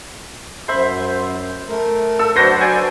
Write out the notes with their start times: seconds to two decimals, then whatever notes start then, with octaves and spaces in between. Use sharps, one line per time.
0.68 F#2 C5 E5 B5
1.68 A3 A#4
2.19 A4 E6
2.36 F#3 D4 F#4 B4 C5 G6 A#6
2.61 D5 G5 G#5